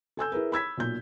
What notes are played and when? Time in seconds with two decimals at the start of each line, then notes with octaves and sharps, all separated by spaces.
0.17 A4 G#5 E6 G6
0.32 E4 G#4 A#4 B4
0.52 B5 E6 G#6 B6
0.77 B1 A#2 G6